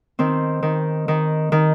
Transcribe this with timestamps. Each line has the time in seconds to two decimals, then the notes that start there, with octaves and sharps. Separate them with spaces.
0.19 D#3 C4
0.63 D#3
1.08 D#3
1.52 D#3